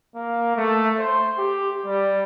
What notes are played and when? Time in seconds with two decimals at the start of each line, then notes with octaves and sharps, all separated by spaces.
0.15 A#3
0.56 A3
0.99 C5
1.38 G4
1.86 G3